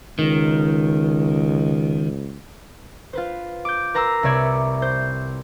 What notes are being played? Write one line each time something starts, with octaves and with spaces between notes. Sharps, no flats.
C#2 D#3
F4 B4 C5
D6 G6
A#4 B4 A#5 C6 E6
C2 C3 C#5 D5 E5 G#6
C5 G6